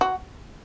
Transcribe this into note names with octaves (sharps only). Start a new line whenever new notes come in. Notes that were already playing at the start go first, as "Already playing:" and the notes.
F#4